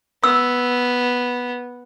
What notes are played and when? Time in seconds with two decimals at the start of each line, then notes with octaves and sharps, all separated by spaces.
0.24 B3 E6